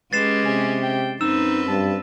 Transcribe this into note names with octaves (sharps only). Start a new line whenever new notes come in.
G#3 C#4 G4 B4 A6 C7 E7
C3 G#5
G5
F#2 C4 D#4 B4 E6 E7
G2 A5